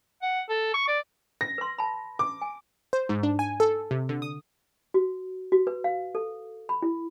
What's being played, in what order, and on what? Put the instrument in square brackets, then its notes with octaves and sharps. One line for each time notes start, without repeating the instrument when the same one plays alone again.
[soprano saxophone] F#5
A4
C#6
D5
[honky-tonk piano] A#6
[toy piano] B4 C6
A5 B5
[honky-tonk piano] D6
[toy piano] G#5
[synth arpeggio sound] C5
G#2
D4
G#5
A4
C3
D3
D#6
[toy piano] F#4
F#4
B4
F5
A4
B5
E4